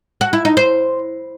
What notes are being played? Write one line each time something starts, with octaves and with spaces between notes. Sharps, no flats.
F#4
E4
D#4
C5